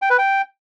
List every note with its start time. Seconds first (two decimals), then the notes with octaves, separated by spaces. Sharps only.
0.02 G5
0.10 B4
0.18 G5